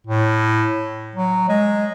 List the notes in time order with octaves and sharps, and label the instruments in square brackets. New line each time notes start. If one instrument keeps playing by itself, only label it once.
[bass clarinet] A2
F#3
G#3